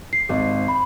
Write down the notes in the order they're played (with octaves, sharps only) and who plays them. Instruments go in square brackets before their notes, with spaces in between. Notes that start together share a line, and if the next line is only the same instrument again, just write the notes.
[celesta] C7
[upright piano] G#1 [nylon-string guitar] G#2
[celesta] B5